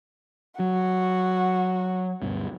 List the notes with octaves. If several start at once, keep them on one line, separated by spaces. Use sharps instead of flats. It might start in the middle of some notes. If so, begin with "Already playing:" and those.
F#3 F#4
D2 G2 B2